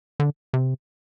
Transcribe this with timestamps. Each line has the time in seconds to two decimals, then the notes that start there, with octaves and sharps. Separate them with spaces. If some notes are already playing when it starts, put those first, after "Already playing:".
0.20 D3
0.54 C3